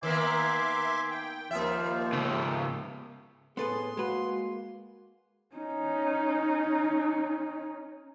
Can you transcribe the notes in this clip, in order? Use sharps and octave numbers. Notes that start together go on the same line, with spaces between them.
D#3 A#3 B3 E5 G#5 C6 D6
G5
D#2 F3 A#3 F4 E5
G#2 C#3 A4
A2 B3 G#4 A4 B4 C6
G#3 A#3 F#4 B4
C#4 D#4